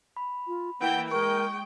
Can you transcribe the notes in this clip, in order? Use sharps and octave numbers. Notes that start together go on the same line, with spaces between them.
B5
F4
E3 A#3 F#5 G5
G#3 A#4 G5 C#6